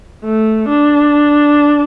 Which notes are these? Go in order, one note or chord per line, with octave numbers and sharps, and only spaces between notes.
A3
D4